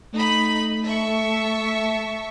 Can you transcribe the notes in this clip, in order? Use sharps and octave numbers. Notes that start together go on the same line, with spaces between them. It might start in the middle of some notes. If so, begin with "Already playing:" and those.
A3 D#4 B5
E5 A5 C#6